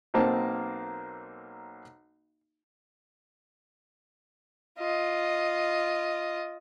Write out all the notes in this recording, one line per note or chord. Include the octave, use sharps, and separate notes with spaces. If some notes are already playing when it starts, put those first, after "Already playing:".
B1 A#3 C4 C5 A5
F4 D#5